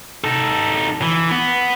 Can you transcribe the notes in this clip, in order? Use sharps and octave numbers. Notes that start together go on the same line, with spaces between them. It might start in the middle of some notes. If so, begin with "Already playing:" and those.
D#4 A4
E3
B3